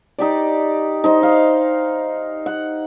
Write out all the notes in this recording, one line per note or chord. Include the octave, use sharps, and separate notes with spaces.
D#4 G4 D5
D#4 C5 D#5
D#5 F5
F#5